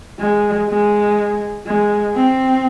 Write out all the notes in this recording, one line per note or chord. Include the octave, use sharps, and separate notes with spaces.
G#3
G#3
G#3
C4